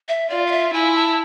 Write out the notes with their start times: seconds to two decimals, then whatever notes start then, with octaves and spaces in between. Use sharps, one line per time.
0.08 E5
0.30 F4 D5
0.46 F5
0.52 E5
0.73 E4 G#5
0.95 A5